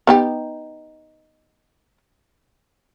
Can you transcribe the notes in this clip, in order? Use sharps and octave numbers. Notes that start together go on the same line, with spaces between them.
B3 D#4 G4